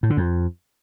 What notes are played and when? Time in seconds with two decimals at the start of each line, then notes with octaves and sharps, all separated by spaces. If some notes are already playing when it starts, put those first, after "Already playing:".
0.03 A2
0.10 D3
0.17 F2